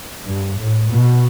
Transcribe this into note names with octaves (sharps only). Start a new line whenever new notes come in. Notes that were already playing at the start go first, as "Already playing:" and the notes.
G2
A2
B2